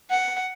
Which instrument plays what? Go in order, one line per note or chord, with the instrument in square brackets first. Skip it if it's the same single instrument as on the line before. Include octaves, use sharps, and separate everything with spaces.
[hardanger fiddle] F#5